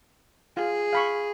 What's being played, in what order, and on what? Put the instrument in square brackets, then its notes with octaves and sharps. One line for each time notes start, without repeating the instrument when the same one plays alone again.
[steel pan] F4 [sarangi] G#4
[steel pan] F5 B5 C#6